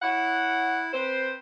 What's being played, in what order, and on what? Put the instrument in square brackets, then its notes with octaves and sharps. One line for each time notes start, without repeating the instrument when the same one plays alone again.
[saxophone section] E4 C#5 F#5
C4 B4 C5